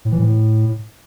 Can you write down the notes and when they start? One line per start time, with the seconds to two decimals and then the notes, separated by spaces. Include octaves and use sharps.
0.05 A2
0.12 E3
0.19 A2